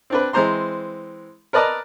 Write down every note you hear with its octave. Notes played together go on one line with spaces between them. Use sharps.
C4 D4 B4
E3 G#3 C4 C5 A#5 C6
A#4 B4 D5 D#5 A5 A#5